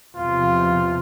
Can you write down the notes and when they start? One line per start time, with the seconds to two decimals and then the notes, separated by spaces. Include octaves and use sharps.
0.15 E2 C3 F3 F4